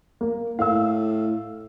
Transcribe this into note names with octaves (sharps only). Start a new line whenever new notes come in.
A#3
A2 F5 E6